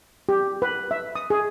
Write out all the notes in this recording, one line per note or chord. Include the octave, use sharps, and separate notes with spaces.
G4
B4
E5
D#6
G#4